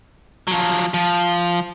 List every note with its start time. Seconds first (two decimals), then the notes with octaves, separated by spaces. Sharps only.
0.48 F3 F#3
0.94 F3